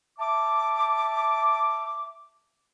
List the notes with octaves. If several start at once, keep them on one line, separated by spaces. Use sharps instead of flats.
E5 A5 D6